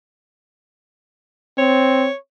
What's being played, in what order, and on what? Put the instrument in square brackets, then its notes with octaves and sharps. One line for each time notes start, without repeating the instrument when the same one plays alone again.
[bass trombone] C4 [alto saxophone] C#5